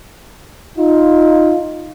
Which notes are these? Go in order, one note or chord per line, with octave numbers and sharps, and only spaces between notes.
D#4 F4